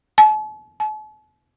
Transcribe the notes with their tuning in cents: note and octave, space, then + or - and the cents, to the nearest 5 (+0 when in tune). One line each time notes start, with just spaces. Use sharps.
A5 -45
A5 -45